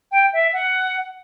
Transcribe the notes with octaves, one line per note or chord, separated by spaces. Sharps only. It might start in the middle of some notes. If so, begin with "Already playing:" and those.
G5
E5
F#5